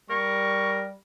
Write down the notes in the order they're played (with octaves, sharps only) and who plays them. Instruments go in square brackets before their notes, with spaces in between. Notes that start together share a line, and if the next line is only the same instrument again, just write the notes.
[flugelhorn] G3 [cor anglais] A#4 [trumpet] C#6